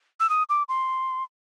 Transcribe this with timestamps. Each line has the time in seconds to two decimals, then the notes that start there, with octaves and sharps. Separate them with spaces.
0.20 E6
0.30 D#6
0.49 D6
0.69 C6